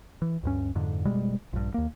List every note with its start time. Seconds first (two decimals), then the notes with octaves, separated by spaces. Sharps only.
0.22 E3
0.43 D2 G2 C#4
0.75 F2 G#2 D3
1.05 F#1 B2 G3 G#3
1.53 A#1 G2
1.74 D#2 A#3